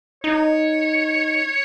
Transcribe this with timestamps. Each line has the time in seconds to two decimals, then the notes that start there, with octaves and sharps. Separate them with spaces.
0.24 D#4 C#5